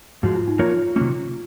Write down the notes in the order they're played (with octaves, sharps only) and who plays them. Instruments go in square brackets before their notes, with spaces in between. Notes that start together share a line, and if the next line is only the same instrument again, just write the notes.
[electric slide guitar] G#2 F3 G#3 [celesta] F#4
[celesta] F4
D#4
[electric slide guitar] F3 A#3 D#4 A#4 C#5 [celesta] F4
[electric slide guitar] C3 D#3 F#3 A#3 C#4